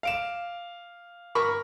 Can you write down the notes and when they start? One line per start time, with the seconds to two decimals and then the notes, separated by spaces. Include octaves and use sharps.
0.03 F5 D7 E7
1.35 A#4 B5 C#6